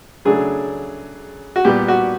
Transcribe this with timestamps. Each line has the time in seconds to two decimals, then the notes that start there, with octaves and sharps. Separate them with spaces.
0.25 C#3 F#3 A3 D4 G#4
1.56 F#4
1.65 A#2 G3 B3 G4
1.88 F#4